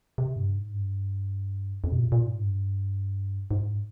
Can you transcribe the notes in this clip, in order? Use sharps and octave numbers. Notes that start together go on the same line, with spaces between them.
C3
G2
G#2
G2
F2
C3
A#2
A#2
G#2
G2
G#2